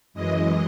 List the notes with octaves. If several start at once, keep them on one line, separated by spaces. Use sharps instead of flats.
F#2 E3 G#3 D#5